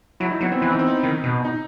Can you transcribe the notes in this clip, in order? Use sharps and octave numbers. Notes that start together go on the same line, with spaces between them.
F#3 E4
D#4
F#3 B3
C4
E3 E4
D#4
C4
D#4
D#3
B2
D#4